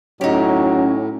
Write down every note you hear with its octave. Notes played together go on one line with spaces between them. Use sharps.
A2 F#3 C#4 D#4 G4